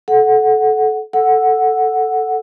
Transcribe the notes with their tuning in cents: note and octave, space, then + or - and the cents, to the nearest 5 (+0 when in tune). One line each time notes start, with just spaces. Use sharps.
A4 -25 F#5 +0
A4 +0 F#5 +0 E6 +0